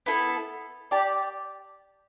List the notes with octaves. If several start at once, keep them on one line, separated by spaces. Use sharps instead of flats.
B3 E4 A4
G4 D5 A5